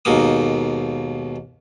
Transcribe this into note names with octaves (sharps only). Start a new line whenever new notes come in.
D#2 G#2 B2 A#3 D#6